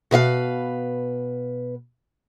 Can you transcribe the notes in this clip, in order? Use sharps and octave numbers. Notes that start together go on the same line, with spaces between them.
B2 B4 E5 F5